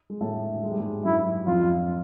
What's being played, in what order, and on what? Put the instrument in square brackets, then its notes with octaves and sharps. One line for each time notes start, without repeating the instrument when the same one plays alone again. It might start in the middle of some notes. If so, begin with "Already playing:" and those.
[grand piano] G#3
A2 A3
G#3
G3
G#2 G#3
[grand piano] F#2 F#3 [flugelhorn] E4
[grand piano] F2 F3 [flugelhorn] F4